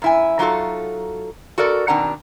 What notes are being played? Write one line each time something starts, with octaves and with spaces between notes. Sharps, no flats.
F#2 E4 G#5
F#3 D#4 F4 F#4 A4
F#4 A4 A#4 D5
B2 D#3 C4 D4 F#5 A#5